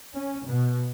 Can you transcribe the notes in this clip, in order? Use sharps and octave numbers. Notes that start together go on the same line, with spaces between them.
C#4
B2